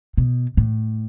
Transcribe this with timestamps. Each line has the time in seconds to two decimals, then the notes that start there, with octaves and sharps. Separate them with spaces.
0.17 B2
0.57 A2